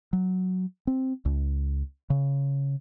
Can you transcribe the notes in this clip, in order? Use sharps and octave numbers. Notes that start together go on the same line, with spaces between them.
F#3
C4
C#2
C#3